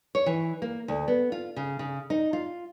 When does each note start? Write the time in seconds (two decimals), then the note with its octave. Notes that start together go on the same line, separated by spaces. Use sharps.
0.15 C#5
0.26 E3
0.62 A#3
0.88 D2
1.08 B3
1.32 F4
1.56 C#3
1.79 C#3
2.10 D#4
2.33 F4